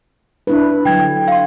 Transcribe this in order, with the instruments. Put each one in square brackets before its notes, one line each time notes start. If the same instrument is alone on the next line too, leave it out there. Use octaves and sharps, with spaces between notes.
[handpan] D4 E4 B4
[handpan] D3 F#3 [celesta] G5 G#6
[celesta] F5 C6